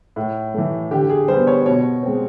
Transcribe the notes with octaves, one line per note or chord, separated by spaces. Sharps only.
A2
E3 A3
D3 G4
G#4
G3 B3 C5
C#5
B2 C#5
G#3 C4